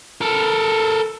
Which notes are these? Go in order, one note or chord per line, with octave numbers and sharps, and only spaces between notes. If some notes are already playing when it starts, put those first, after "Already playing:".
A4 A#4